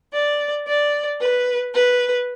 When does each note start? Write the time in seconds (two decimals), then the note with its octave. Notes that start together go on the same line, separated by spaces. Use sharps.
0.13 D5
0.67 D5
1.19 B4
1.73 B4